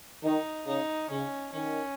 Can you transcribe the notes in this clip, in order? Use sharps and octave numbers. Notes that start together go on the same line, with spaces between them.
D#3 D#4
C#3 D#4
C#3 C#4
D#3 C#4